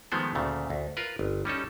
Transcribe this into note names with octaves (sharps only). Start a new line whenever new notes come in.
D#3 F3 G#3 A3 B3 C5
D2 A#2 C#3 A3
D2
F4 A#4 B4
G1
G3 C#4 D#4 A4